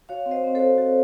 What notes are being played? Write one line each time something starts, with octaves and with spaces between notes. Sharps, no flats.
F#4 C#5 F5
C4
C5 D#5
C4
F#4 A4 C5
F#4 A4